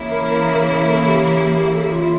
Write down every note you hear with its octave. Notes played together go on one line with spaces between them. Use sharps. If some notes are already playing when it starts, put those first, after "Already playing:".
Already playing: C#3 E3 A#3 E4
A#4
A#4
C#5
C#5
A#4
A4
A4
G4
A4
G4
F4